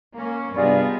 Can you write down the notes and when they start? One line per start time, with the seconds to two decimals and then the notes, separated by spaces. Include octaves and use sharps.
0.18 A#3 C#4
0.56 G2 C3 B3 D#4 F4 G#4 D5